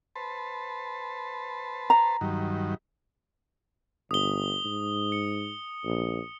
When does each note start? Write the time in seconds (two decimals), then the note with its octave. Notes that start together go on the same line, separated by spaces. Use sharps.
0.16 B4 C5 A5
1.90 A#5
2.21 G2 D#3 F#3
4.11 G1 D#6 G7
4.65 G#2
5.12 C#7
5.85 A#1